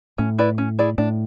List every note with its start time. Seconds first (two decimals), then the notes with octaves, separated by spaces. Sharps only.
0.18 A2 C#4
0.39 E4 B4 D5
0.58 C#4
0.79 E4 G#4 D5
0.98 A2 D4